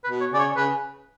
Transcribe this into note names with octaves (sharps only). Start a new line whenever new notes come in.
B4
B2
C#5
C#3 D5
C#5
C#3 B4